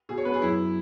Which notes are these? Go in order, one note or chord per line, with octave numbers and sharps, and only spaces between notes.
B2 G#4
C#5
B3 B4
G#4
F#2 E4